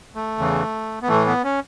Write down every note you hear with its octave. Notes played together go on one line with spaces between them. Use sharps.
A3
E2 C#3 E3
B3
A2 E3 A3
B3
C#4